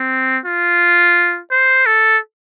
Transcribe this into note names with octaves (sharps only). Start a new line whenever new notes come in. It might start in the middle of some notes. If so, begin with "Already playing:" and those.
Already playing: C4
F4
C5
A4